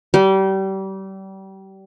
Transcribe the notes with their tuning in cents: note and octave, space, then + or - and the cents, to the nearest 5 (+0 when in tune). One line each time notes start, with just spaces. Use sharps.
G3 -30